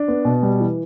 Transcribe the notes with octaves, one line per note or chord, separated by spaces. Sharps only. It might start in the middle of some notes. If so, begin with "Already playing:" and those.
Already playing: D4
B3
B2
G3
E3